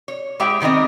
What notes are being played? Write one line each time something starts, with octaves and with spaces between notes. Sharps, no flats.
C#5
G#3 E4 G4 G#4 E5 G5
B2 D#3 B3 C4 D#5